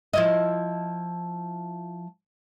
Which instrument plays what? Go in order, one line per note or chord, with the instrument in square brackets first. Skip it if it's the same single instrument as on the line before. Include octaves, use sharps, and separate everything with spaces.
[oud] F3 E4 D#5